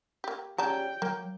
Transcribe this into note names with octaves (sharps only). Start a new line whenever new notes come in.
A#3 G4
C#3 G4 C#5 D5 G5 A5 A#5
F#3 A#3